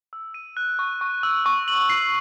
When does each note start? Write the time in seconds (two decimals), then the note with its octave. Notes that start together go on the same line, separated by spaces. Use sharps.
0.13 E6
0.34 D#7
0.57 F#6
0.79 C#6
1.01 C#6
1.23 E6
1.46 C#6
1.68 F#7
1.90 C7